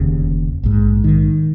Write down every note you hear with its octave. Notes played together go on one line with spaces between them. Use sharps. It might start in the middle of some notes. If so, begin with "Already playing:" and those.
Already playing: F1 D#2 C#3
A#1 G#2
D#3